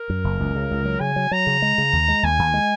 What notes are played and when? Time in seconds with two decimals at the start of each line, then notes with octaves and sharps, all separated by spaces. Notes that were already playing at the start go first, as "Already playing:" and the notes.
Already playing: A#4
0.10 F#2
0.24 F#1
0.40 C#2
0.56 C#3
0.71 C#2
0.85 F#3
1.00 C#3 G#5
1.16 F#3
1.31 F#3 A#5
1.47 C#3
1.62 G#3
1.78 C#3
1.93 D#2
2.08 G#3
2.23 D#2 G#5
2.39 D#2
2.54 G#3